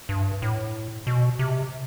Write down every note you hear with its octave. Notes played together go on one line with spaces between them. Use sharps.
G2
A2
B2
C3